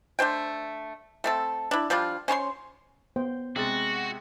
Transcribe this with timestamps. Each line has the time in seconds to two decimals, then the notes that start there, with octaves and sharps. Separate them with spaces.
0.19 A3 D4 C5 G5
1.24 A3 C4 A4
1.71 D4 E4
1.90 F3 G3 D4 F4
2.28 C#4 C5 C#5 C6
3.16 B3 C5 G5
3.56 C3 G#3 F#4 A6